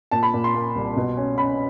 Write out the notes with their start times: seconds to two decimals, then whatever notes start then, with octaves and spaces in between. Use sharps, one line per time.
0.11 A#2 A5
0.23 B5
0.34 A#2
0.44 C6
0.54 A#3
0.76 C2
0.97 B2
1.17 C#4
1.38 C#4 B5